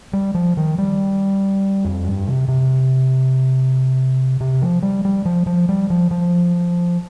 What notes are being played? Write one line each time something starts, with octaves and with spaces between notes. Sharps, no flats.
G3
F3
D#3
G3
F2
G2
C3
C3
C3
F3
G3
G3
F3
F3
G3
F3
F3